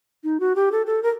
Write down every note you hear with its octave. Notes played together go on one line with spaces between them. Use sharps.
D#4
F#4
G4
A4
A4
A#4